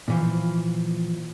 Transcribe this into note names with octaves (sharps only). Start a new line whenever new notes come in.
A#2 E3 F3